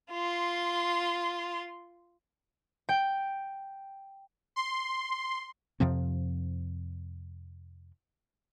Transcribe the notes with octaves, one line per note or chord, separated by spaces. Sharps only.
F4 C6
G5
C6
F2 C3 F3 C4